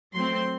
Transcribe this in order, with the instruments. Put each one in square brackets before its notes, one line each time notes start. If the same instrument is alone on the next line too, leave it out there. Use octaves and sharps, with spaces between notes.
[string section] F#3 A3 C4 C6